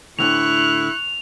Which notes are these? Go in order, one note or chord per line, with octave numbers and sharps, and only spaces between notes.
D2 A2 D3 E4 C#6 F#6 F7